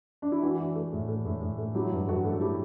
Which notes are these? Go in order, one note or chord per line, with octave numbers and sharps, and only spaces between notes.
D4
E4
E3 D4 F#4
E3
A3
A2
A3
A2
A2
A3
F#3 E4 G4
G2
G2 F#4 A4
A3
A4
A3 E4 G4